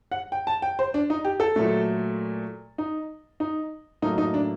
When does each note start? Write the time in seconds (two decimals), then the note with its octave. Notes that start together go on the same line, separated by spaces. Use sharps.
0.12 F#5
0.32 G5
0.47 A5
0.62 G5
0.79 C5
0.94 D4
1.10 D#4
1.25 G4
1.40 A4
1.56 A#2 F#3 A3
2.78 D#4
3.40 D#4
4.02 A2 F#3 A#3 D#4
4.18 D#4
4.34 D4